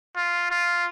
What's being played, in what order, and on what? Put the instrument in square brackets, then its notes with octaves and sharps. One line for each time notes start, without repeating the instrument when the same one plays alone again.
[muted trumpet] F4
F4